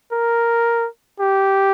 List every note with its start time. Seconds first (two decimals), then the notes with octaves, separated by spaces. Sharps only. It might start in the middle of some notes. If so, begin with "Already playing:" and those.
0.12 A#4
1.20 G4